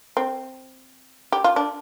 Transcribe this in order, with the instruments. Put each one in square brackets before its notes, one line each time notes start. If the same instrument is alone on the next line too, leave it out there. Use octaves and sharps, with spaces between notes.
[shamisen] C4
G4
F4
D4